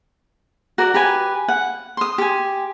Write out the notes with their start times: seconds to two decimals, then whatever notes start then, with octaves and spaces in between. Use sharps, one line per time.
0.78 F#4 A#4 D5
0.94 G4 B4 G#5
1.48 F#5
1.97 C6 D#6
2.18 G4 G#5